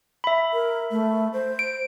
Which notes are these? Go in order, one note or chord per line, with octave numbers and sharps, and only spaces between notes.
E5 B5
A#4
A3
C5
D7